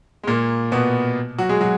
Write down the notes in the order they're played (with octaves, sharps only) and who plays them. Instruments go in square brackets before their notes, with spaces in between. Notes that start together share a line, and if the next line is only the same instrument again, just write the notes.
[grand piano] G#3
A#2 A#3
B2 B3
F#3 F#4
G#3 G#4
F#3 F#4